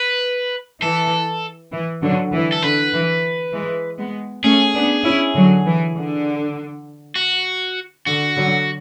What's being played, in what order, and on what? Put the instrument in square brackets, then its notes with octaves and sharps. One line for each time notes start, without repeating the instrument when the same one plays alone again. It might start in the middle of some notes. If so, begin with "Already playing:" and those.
Already playing: [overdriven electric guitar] B4
[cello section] E3 [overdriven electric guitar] A4
[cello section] E3
D3 F#3
E3
[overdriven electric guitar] A4
[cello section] D3 [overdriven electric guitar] B4
[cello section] E3
E3 G#3
G#3 B3
[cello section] A3 C#4 [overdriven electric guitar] G#4
[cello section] B3 D4
C#4 E4
D3 F#3
E3
D3
[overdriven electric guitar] F#4
[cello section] D3 [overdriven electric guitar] F#4
[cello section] D3 F#3